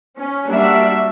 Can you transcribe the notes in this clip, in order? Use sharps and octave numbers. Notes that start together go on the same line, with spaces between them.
C#4
G3 A#3 D4 F#4 E5